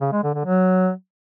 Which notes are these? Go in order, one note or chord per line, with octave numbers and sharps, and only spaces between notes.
C#3
G#3
D3
D3
F#3